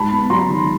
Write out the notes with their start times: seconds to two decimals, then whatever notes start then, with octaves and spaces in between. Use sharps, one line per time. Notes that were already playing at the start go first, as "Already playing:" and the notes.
Already playing: G#2 A5 B5
0.12 B3
0.30 F#3 A#5 C6
0.49 D#3